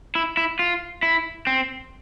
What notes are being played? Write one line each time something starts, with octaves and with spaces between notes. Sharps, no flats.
E4
E4
F4
E4
C4